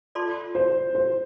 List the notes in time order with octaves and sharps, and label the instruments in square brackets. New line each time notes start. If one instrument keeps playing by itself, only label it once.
[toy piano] F4 A4 D5 A5 C6
[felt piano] C5
C5